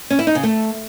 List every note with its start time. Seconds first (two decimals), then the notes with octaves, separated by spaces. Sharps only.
0.10 C#4
0.19 E4
0.27 D#4
0.35 C#3
0.43 A3